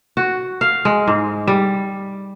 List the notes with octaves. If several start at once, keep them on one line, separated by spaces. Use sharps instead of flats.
F#4
F5
G#3
G#2
G3